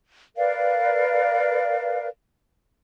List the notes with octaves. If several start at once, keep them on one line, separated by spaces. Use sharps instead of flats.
A#4 B4 D5 F5